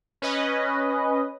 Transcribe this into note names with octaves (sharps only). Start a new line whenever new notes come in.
C#4 B4 D#5